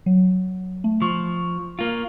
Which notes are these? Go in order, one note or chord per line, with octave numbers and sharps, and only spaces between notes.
F#3
A3
F3 C#6
A#3 F4